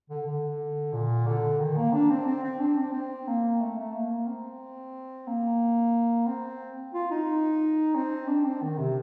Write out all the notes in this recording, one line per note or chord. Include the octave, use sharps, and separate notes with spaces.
D3
D3
A#2
D3
D#3
A#3
D4
C4
C4
C4
D4
C4
C4
A#3
A3
A3
A#3
C4
A#3
C4
F4
D#4
C4
D4
C4
D#3
C3